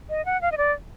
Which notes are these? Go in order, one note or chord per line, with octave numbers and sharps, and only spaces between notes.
D#5
F#5
F5
D#5
D5